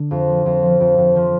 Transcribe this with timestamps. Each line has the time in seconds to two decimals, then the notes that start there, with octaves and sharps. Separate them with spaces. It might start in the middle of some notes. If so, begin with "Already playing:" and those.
Already playing: D3
0.11 F2
0.28 F3
0.46 F2
0.62 F3
0.80 F2
0.98 F2
1.16 F3